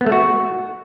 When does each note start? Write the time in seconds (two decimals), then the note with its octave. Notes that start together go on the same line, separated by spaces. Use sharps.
0.01 B3
0.06 A3
0.12 F#4